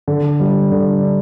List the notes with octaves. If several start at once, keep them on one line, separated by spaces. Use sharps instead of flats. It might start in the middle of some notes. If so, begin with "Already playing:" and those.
D3
G3
D3
D4